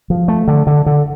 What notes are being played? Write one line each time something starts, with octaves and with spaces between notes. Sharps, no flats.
F3
A3
D3
D3
D3